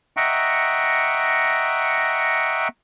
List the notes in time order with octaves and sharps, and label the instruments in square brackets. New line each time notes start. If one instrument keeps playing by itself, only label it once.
[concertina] D#5 E5 F#5 G5 A#5 C#6